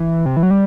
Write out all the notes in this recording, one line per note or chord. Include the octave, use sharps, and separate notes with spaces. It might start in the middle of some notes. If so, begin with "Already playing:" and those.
Already playing: E3
C3
E3
F#3
G3